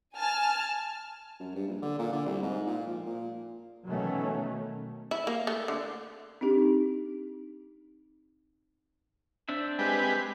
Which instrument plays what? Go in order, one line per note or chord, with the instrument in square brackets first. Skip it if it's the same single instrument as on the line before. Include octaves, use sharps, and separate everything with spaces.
[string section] G#5 A5 F6
[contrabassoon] F#2
G2
A#1
D3
A#2
D3
C2
G#2
A#2
F3
A#2
[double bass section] B2 D#3 E3 F#3 A3 C#4
[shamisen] E4
A#3
A3
D3
[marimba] C4 D4 D#4 G4
[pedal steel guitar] C4 D4 E5
[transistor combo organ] G#3 G4 B4